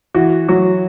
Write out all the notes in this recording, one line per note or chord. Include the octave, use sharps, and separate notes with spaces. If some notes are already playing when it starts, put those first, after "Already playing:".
E3 F#4
F#3 F#4